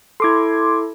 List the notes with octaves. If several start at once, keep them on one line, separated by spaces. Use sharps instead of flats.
E4 A4 C6 D6 G#6